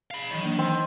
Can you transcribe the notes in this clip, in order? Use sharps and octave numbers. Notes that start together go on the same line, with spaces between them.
F5 B5
D#3 E3 F#3
E3 A#3 D4
C4